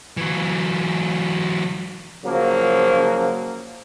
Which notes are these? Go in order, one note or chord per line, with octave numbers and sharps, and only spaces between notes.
E3 F#3
C#3 F3 F#3 A#3